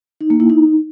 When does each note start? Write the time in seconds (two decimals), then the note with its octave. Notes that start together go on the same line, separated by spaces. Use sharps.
0.21 D#4
0.30 A#3
0.40 E4
0.50 D#4